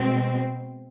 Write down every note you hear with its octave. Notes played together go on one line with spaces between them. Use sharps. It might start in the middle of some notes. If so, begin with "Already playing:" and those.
Already playing: B2 G#3 C4